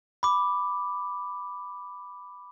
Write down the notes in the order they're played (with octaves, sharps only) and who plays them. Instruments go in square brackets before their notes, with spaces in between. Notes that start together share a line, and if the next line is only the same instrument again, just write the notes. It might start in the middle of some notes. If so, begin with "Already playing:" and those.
[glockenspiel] B5 D6